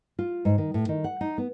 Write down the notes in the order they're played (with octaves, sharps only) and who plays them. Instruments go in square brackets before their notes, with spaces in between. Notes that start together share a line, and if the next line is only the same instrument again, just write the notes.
[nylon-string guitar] F4
G#2
D#3
A2
D#3
F#5
D#4
B3